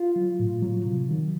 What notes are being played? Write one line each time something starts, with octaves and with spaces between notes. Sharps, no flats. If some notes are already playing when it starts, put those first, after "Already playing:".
Already playing: F4
F#3
A2
F#3
C3
D#3 F#3